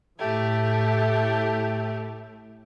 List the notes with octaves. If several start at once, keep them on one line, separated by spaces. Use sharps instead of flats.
A2 A3 G4